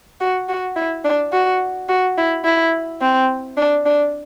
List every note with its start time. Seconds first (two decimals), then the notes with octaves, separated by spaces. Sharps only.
0.20 F#4
0.49 F#4
0.76 E4
1.04 D4
1.33 F#4
1.89 F#4
2.18 E4
2.45 E4
3.01 C4
3.57 D4
3.86 D4